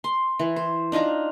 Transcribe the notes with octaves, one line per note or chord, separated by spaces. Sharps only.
C6
E3
C5
D4 D#4 F4 A#5